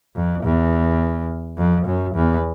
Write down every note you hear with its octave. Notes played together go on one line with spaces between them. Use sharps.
F2
E2
F2
F#2
E2